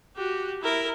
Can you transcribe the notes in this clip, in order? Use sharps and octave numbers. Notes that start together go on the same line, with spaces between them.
F#4 G4
E4 A#4